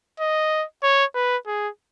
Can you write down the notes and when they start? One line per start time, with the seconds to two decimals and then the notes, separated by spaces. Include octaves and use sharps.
0.20 D#5
0.83 C#5
1.15 B4
1.47 G#4